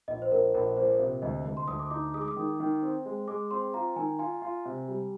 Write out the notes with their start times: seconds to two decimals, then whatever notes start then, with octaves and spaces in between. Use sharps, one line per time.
0.08 A#1 D#5
0.22 C5
0.32 A#1 A#4
0.54 A#1 A#4
0.77 A#2 C5
0.99 C3
1.22 D2 D#5
1.45 D2
1.57 C6
1.68 D2 D#6
1.79 D6
1.90 D#4 D6
2.14 G#3 D#6
2.21 D6
2.28 D#6
2.36 D#3
2.60 D#3
2.82 C4
3.05 G#3
3.28 G#3 D6
3.51 C4 C6
3.74 F4 A#5
3.96 D#3 G#5
4.19 F4 G#5
4.42 F4
4.65 C3
4.88 G3